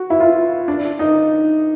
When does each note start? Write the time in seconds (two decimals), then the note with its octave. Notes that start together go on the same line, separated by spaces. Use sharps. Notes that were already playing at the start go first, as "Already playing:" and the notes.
Already playing: F#4
0.10 E4
0.20 F4
0.68 D4
0.99 D#4